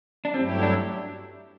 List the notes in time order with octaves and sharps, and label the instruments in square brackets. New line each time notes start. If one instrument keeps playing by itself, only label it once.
[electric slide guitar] D4
[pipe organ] G2 F#3 A3 E4 G4 [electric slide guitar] C4
[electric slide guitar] D4